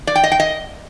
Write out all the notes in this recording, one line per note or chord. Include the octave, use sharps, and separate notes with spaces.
D5
G5
D#5
G5
D#5